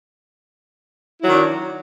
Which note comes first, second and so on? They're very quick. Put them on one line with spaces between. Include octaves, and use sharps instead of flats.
E4 F#3 D#3 D4